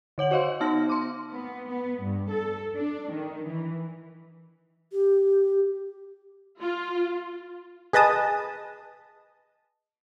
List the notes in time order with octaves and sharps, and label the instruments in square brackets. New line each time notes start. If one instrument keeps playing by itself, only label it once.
[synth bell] D3 C#5 F#5 F#7
F#4 C5 D#5 F5 C6
B3 D#4 A5 F6 A#6
C6 D6
[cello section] B3
B3
G2
A4
D4
D#3
E3
[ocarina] G4
[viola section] F4
[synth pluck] G#4 B4 D#5 A5 D#6